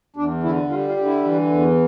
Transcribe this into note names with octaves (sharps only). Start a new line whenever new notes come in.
E2 D4
D3 E4
G3 F4
F4
D3
E4
E3
E2